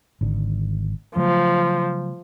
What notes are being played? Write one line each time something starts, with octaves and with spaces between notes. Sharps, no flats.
G#1 D3
C#3 F3 F#3 A3